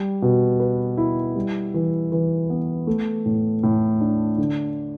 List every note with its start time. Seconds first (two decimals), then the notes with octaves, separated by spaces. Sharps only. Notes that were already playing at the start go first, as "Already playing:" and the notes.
Already playing: G3
0.22 B2
0.60 B4
0.97 E4
1.35 G3
1.74 E3
2.12 E3
2.50 B3
2.87 A3
3.26 A2
3.63 A2
4.01 D4
4.38 D3